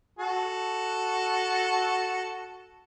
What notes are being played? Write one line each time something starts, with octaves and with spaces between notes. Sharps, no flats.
F#4 A4